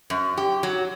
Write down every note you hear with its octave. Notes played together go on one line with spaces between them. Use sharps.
F#2
G4
F#3